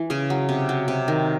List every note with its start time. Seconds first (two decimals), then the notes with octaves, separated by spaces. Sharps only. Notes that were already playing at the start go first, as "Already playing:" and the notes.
Already playing: E3
0.10 C#3 G#4
0.30 F#3
0.49 C3
0.69 F#3
0.88 C3
1.08 D#3